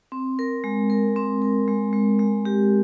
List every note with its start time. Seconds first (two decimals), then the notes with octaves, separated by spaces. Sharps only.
0.12 C4
0.39 A#4
0.64 G#3
0.90 A#4
1.16 C4
1.42 A#4
1.68 G#3
1.93 G#3
2.19 G#3
2.45 G4